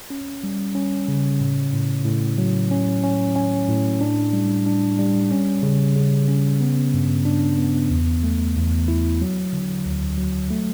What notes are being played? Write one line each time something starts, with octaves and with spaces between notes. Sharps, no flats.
C#4
G3
C#4
C#3
A2
A2
A2
F#3
C#4
C#4
C#4
A2
D4
G3
D4
G3
C#4
C#3
C#3
C#4
B3
G2
D4
B3
E2
A3
E2
E4
F#3
D3
D2
F#3
A3